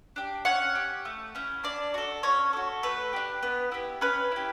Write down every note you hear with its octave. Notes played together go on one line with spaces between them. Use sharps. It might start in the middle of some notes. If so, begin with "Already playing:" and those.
D4 G4
C#4 F#5
G4
A3
C#4 E4
D4 D5
F#4 A4
C#4 C#5
F#4 A4
A3 B4
D4 G4
B3
E4 G4
C#4 B4
E4 G4